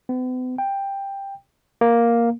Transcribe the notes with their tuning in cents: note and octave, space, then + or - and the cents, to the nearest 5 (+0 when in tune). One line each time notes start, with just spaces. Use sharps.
B3 +45
G5 +10
A#3 +5